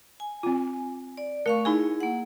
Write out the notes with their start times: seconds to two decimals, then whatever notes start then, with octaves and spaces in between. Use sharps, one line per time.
0.20 G#5
0.43 C4 F4
1.17 D5
1.46 A3 A#4 F5 C#6
1.65 D#4 E4 G#4 G#5
2.00 A#3 F#5